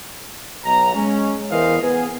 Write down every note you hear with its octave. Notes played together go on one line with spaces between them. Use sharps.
B1 A#5
G#3 C#4
E2 E3 A#4 C5 D#5 F5
B3 G#4